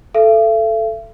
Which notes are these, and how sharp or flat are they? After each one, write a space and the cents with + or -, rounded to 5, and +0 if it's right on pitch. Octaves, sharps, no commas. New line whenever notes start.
A4 +0 E5 +45